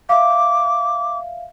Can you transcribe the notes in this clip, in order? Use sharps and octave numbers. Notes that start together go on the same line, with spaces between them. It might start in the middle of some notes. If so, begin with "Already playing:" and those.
E5 F5 D6